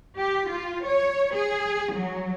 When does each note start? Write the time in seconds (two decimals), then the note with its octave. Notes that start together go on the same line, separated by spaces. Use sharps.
0.18 G4
0.51 F4
0.85 C#5
1.35 G#4
1.95 F#3